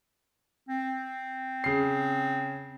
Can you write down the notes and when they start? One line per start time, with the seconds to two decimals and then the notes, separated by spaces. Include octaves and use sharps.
0.69 C4
1.64 C#3 C7